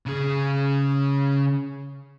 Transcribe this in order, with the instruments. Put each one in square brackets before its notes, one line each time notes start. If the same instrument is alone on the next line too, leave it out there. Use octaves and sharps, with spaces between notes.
[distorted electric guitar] C#3 G#4